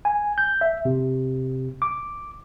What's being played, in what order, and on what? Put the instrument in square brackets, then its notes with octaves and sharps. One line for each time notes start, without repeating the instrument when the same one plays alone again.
[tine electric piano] G#5
G6
E5
C3
D6